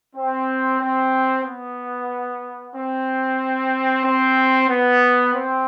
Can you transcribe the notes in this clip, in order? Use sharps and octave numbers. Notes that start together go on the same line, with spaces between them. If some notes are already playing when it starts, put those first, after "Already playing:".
C4
C4
B3
C4
C4
B3
C4